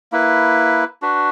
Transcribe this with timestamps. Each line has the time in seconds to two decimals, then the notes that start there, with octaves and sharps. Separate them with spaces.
0.12 A#3 E4 B4
1.02 D4 F#4 B4